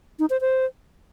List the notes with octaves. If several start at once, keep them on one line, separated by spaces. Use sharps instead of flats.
D#4
C5
C5